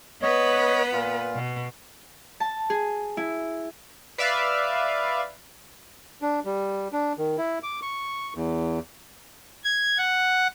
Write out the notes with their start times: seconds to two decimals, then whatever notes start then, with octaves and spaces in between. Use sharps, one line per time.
0.22 B3 B4 C#5 D#5
0.93 A#2 F4
1.35 B2
2.40 A5
2.70 G#4
3.17 E4
4.18 B4 D5 E5 F5
6.22 D4
6.45 G3
6.93 D4
7.18 D#3
7.38 E4
7.63 D6
7.82 C#6
8.35 E2
9.64 G#6
9.98 F#5